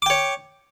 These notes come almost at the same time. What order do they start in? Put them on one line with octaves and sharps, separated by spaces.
D6 G5 C#5